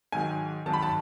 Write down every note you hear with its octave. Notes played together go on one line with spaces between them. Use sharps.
G#2 D#3 F#3 G#5
G#2 D#3 F#3 A5
B5
A5